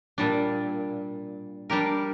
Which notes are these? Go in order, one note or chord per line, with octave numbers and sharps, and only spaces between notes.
A#2 G3 D4
G3 D4 G4 A#4